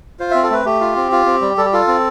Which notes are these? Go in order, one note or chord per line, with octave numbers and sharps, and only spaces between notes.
F4 C5
C4 E5
A4
A3 B4
A3 G4
F4
C4
F4
C4
G3
G3 A4
G4
F4 A4
C4